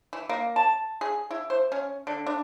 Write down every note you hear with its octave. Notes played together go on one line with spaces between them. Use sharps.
E3
A#3
A5
G#4
E4
C5
C#4
D3
D4